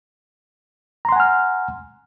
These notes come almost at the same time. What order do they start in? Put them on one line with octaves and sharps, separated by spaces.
A#5 C6 F#5 G#5 F6